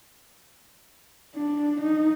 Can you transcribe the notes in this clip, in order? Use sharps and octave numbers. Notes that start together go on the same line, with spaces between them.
D4
D#4